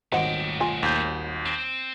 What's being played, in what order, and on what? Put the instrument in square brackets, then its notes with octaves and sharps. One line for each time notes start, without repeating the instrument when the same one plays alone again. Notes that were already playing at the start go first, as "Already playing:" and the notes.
[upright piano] D#1 G#1 D#5 [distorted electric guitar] A3 G5 [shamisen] C5 F#5
[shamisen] F4 G#5
[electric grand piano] D#2 G6
[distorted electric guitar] C4 C5